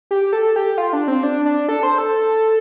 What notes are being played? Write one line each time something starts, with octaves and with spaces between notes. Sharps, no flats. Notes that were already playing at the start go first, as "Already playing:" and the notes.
G4
A4
G4
F4
D4
C4
D4
D4
A4
C5
A4